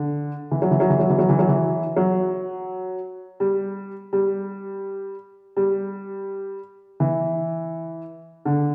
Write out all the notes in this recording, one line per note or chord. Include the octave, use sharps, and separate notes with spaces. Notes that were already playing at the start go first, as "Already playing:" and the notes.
Already playing: D3
E3
F#3
E3
F#3
E3
F#3
E3
F#3
E3
F#3
E3
F#3
G3
G3
G3
E3
D3